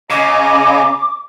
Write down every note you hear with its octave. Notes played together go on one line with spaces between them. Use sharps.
C#3 D#5 G#5 A#5 D6